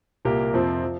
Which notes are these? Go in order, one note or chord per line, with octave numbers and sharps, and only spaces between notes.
C2 A#2 A#3 G4 A#4
F2 C3 F3 C4
F3